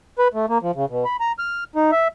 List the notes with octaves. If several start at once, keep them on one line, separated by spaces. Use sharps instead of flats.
B4
A3
A#3
F3
C#3
B2
B5
A#5
F6
D#4
E5